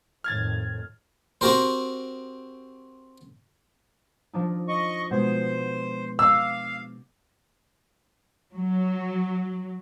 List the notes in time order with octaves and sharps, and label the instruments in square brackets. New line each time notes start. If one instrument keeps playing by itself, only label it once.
[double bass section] F2 A2 D#3 [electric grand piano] F6 G#6 A6
[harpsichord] C4 F#4 G4 A#4 C5
[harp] F3 D4 D#4
[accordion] D#5 C#6
[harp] B2 G#3 B3 [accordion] C5
[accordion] F5 [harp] D6 [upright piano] E6
[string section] F#3